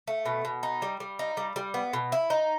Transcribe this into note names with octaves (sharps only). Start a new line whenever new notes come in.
A3
B2
B2
D#4
G3
G3
D#4
G3
G3
B3
B2
E4
D#4